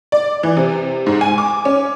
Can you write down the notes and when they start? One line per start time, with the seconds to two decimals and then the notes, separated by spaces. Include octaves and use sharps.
0.12 D5
0.43 E3
0.57 C3
1.06 G#2
1.21 G#5
1.38 D6
1.65 C#4